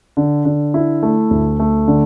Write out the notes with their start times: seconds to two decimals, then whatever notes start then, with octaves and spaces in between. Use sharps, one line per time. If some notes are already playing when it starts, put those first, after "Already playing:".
0.17 D3
0.45 D3
0.74 E4
1.03 A3
1.31 D2
1.60 A3
1.88 D3